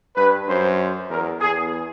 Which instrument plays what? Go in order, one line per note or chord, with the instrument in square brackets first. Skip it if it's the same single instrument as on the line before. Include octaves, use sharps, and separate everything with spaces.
[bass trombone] G2 [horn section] B4
[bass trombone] F#2 [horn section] C5
[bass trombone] E2 [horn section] A#4
[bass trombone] E2 [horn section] G#4